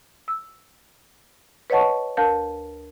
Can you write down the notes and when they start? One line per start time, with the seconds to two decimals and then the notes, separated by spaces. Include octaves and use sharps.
0.28 E6
1.70 B4 C#5 D#5 F#5 A5 C#6
2.17 D2 A#4 A5 G6